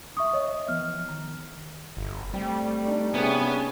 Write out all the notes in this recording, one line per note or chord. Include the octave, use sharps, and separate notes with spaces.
E5 C#6 D#6
C#5 D#5 E5
E3 F3 B3 F6
D#3 A#5
G1
G3 A3 C4
D4 D#4 D5
C3 B3 C#4 G#4